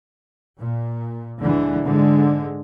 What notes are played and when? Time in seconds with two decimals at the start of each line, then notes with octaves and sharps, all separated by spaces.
0.59 A#2
1.41 D2 D3 E3 G#3
1.86 G#2 D3 G#3